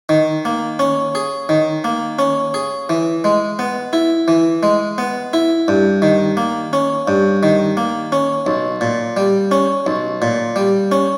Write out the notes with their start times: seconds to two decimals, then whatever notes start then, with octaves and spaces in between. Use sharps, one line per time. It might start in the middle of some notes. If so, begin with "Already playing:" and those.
0.09 D#3
0.45 A#3
0.79 C#4
1.15 G#4
1.49 D#3
1.84 A#3
2.19 C#4
2.54 G#4
2.89 E3
3.24 G#3
3.59 B3
3.93 E4
4.28 E3
4.63 G#3
4.98 B3
5.33 E4
5.68 G2
6.02 D#3
6.37 A#3
6.73 C#4
7.08 G2
7.43 D#3
7.77 A#3
8.12 C#4
8.47 B1
8.81 A#2
9.17 G3
9.51 C#4
9.87 B1
10.22 A#2
10.56 G3
10.92 C#4